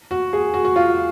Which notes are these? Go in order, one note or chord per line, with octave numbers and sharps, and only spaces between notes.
F#4
G#4
F#4
F#4
F4